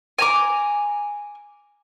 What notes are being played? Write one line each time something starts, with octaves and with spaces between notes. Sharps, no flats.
G#5 A#5 D6